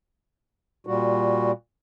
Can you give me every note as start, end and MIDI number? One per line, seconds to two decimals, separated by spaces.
0.87 1.51 46
0.87 1.51 55
0.87 1.51 66